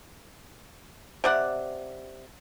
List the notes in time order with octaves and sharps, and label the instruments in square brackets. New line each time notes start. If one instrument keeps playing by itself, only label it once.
[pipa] C3 D5 F#5